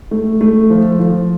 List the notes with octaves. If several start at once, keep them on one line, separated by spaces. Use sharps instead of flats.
A3
A3
F3
F3